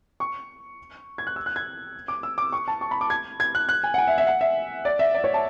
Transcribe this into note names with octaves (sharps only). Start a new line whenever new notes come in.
C#6
G#6
F#6
E6
F#6
G#6
D6
E6
D6
C#6
A5
C#6
B5
D6
G#6
G#6
F#6
F#6
G#5
F#5
G#5
E5
E5
F#5
E5
D5
E5
D5
C#5
A5